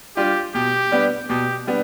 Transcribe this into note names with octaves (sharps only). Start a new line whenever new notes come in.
G3 D4 F4 G4
B2 G4
G3 B3 D4
B2 G4
G3 B3 D4